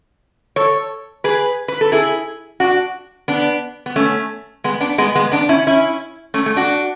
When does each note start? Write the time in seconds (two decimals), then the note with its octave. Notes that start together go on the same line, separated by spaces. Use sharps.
0.56 A4 C#5
1.24 G#4 B4
1.68 B4
1.81 A4
1.92 E4 G#4
2.60 D4 F#4
3.28 B3 D4
3.86 B3
3.96 A3 C#4
4.64 G#3 B3
4.81 B3 D4
4.98 G#3 B3
5.16 G#3 B3
5.32 B3 D4
5.49 C#4 E4
5.67 C#4 E4
6.34 A3 C#4
6.46 A3
6.56 D4 F#4